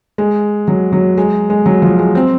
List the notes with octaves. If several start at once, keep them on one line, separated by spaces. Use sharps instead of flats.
G#3
F#3
F#3
G#3
G#3
F#3
F3
G#3
C4